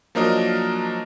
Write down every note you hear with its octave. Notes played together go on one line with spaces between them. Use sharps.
F3 F#3 A#3 D4 A#4 D#5